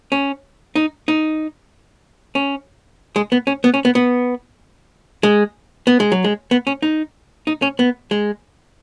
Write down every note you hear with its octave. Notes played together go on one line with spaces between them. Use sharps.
C#4
D#4
D#4
C#4
G#3
B3
C#4
B3
C#4
B3
B3
G#3
B3
G#3
F#3
G#3
B3
C#4
D#4
D#4
C#4
B3
G#3